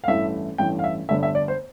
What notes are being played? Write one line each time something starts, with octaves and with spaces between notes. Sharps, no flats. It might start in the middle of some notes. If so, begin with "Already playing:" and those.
F5
A1 G2 E3 A3 E5
A1 G2 E3 A3 G5
F5
E5
G1 G2 D3 A3 E5
E5
D5
C5